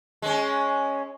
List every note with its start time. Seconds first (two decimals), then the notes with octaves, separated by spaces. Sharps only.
0.22 G#3 C#4